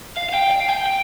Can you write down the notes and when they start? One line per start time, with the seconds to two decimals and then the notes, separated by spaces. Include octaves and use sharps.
0.17 F5
0.29 F5
0.34 G5
0.51 G5
0.60 F5
0.69 G5
0.86 G5